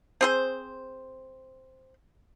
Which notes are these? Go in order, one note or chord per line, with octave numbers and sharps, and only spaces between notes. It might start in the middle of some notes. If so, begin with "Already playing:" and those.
C4 G#4 C5